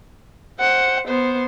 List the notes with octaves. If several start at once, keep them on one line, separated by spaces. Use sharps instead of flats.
C5 F#5
B3 C5